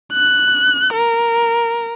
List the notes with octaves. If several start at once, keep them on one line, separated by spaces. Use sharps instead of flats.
F#6
A#4